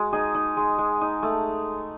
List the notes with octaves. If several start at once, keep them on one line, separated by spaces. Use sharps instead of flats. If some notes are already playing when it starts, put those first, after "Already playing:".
Already playing: G#3 F#4
D#4 G#4
D#4
G#3
G#3
D#4
A3